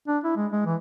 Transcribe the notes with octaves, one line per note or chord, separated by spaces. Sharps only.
D4
E4
G#3
G#3
E3